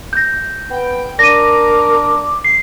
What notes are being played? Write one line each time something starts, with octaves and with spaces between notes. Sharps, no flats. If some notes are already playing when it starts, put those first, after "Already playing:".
G6 A#6
B3 G5
D4 A#4 D6 A#6 D#7
C7